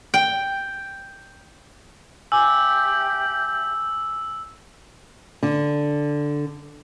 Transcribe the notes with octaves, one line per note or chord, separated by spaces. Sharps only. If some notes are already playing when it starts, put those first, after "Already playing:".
G5
G4 E5 G#5 D6 E6 G6
D3